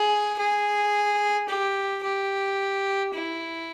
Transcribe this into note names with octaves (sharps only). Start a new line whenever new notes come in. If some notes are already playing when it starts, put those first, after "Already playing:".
Already playing: G#4
G#4
G4
G4
E4